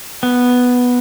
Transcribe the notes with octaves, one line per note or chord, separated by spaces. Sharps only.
B3